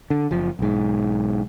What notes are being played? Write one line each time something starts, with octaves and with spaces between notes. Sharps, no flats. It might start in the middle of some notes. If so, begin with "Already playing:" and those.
D3
F#1 F3
B1 G#2